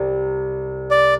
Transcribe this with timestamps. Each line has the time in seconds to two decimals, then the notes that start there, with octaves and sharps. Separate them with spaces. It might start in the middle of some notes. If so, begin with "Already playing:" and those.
Already playing: C2 C3 G3
0.91 D5